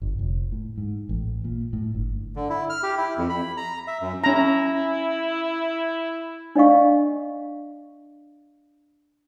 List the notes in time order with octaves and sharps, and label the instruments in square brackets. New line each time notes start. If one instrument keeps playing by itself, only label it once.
[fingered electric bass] G1
F1
A2
G#2
A1
A#2
A2
G1
[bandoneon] D3
E4
F6
G4
E4
F2
B5
A#5
E5
F#2
[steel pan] C#4 A#5 [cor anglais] E4
[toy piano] D4 D5 D#5 F5 C#6